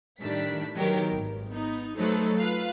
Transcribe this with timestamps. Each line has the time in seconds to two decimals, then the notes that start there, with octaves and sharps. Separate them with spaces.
0.20 A2 D#3 G3 D4 B6
0.74 D#3 F#3 B3 G4 A#4
1.11 G#1
1.50 B3 D#4
1.98 F#3 A3 D#4 A4 B4 C5
2.37 F4 B4 F5